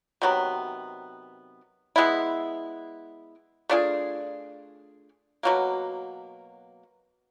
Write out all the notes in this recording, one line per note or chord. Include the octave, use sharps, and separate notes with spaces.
C3 D#3 F#3 B3
G#3 B3 E4
A3 D4 F4 G#4
B2 F#3 A#3